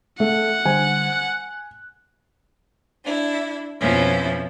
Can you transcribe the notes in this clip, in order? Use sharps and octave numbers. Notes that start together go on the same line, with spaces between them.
A3 E5 F#5
D3 G3 C5 G#5
F#6
D4 E4
F2 B2 F3 C#4 E4